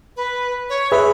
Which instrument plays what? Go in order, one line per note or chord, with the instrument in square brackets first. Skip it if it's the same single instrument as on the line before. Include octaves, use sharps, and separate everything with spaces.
[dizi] B4
C#5
[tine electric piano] G#4 B4 E5 [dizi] B5